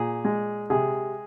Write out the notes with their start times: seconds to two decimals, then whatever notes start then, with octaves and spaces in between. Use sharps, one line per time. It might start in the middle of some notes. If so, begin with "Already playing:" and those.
Already playing: A#2 G#4
0.25 G#3
0.70 C3 G#4